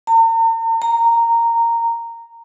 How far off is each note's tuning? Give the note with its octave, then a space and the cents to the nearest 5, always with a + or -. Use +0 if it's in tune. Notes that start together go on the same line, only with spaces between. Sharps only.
A#5 -45
A#5 -10